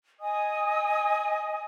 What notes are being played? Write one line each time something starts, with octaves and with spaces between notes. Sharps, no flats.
D#5 G#5 D#6